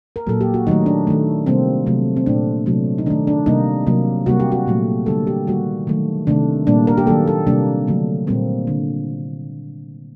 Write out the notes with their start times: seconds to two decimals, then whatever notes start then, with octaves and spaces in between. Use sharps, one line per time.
0.16 A#4
0.27 A#2 F#3 A#3 A4
0.41 G4
0.54 F#4
0.67 D#3 F#3 A3 D#4
0.86 D4
1.07 D#3 A3
1.46 C3 G3 A#3 C4
1.86 C3 F#3 A3
2.17 C4
2.26 A#2 A3 D4
2.66 C3 F#3 A3
2.98 D#4
3.06 D#3 D4
3.10 A3
3.27 D4
3.46 C3 G3 A#3 D#4
3.87 C3 F#3 A#3
4.26 C3 G3 A#3 F#4
4.40 G4
4.52 F#4
4.67 A#2 F#3 A3
5.06 D3 G3 A#3 A4
5.27 G4
5.47 D#3 G3 A#3 F#4
5.87 D#3 F#3 A3
6.27 C3 D#3 A3 D4
6.67 A#2 G3 A#3 D4
6.87 A#4
6.97 G4
7.07 D#3 F#3 A#3 A4
7.28 A4
7.47 C3 G3 A#3 D4
7.88 D3 F#3 A3
8.27 A#2 G3 A#3 C4
8.67 D3